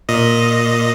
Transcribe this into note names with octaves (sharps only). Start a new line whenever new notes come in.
A#2 D#5